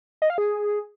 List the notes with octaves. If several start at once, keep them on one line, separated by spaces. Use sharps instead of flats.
D#5
F5
G#4